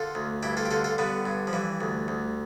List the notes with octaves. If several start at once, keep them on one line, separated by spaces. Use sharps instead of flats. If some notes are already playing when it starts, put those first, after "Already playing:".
Already playing: D3 F4 A4
D2
G2 E4 G4
F4 A4
G4
D3 F4 A4
F4 A4
D3 G3 B3
G2
F3
E3 G3
D2
D2